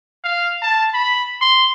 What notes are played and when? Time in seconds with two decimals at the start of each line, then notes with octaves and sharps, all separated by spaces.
0.24 F5
0.62 A5
0.94 B5
1.41 C6